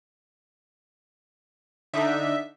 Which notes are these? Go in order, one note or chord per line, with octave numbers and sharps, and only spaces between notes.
D3 D4 D#4 E5